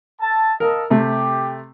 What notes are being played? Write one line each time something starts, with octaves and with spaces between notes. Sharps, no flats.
A4 A5
A4 A#4 D#5 F5
C3 A3 G4